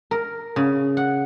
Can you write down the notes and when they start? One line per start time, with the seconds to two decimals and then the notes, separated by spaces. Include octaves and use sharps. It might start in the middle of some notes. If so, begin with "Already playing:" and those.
0.11 A#4
0.56 C#3
0.97 F#5